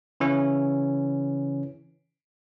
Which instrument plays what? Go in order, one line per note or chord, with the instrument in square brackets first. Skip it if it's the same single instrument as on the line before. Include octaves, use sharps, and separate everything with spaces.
[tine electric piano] C#3 E3 C#4